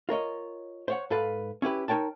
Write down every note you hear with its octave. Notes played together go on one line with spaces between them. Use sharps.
F4 A#4 C#5 D#5
C5 C#5 F#5
G#2 A4 B4 F5
C#4 E4 G4 B4
D#4 A#4 C#5 G5 A5